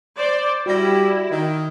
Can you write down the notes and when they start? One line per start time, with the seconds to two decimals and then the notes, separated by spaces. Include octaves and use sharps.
0.16 C5 D5
0.66 G3 E4 F#4 A#6
1.30 D#3